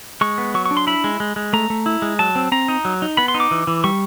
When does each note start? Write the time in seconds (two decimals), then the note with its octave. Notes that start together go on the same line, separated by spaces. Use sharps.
0.21 G#3 C#6
0.38 B3
0.54 F#3 C#6
0.66 C#6
0.71 D4
0.77 C6
0.87 E4 B5
1.04 G#3
1.20 G#3
1.36 G#3
1.53 A3 A#5
1.70 A3
1.86 E4
2.02 G#3
2.19 F#3 A5
2.36 C4
2.52 C4 A#5
2.68 D#4
2.85 F#3
3.02 D#4
3.17 B3 B5
3.28 C6
3.35 D#4
3.40 D6
3.51 E3
3.67 E3
3.84 G3 C#6